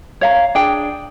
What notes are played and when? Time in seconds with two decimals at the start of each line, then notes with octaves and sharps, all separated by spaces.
0.21 C#5 F5 A#5
0.55 D4 G#4 G5